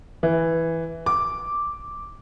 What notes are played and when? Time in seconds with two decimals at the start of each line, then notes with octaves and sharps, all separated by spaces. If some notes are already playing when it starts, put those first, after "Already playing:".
0.23 E3
1.06 D6